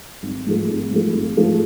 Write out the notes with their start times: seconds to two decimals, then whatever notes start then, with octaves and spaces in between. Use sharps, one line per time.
0.23 G#1
0.47 G#2 F3 A3
0.69 G#1
0.91 G#2 F3 A3
1.15 G#1
1.37 G#2 F3 A3